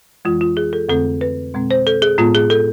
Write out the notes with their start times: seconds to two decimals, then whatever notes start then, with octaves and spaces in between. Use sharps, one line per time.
0.25 F2 E3 G#3 F4
0.41 F4
0.57 G#4
0.73 A4
0.89 F2 D3 A3 C4 A4
1.21 B4
1.54 B2 G#3 C4
1.71 C5
1.87 A4
2.02 G#4
2.18 A2 G#3 B3 F4
2.35 G#4
2.50 A4